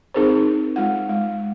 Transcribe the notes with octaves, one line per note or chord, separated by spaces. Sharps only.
C4 D#4 G#4 A#4 C5
G#3 F4 F#5
G#3